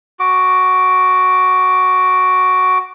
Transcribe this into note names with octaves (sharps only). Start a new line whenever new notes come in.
F#4 D6